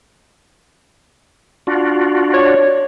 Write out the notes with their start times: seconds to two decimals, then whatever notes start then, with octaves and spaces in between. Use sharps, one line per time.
1.67 D4 F4 F#4
2.33 C#5 D5